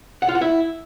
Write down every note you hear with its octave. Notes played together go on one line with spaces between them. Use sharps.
F#5
F4
F#5
E4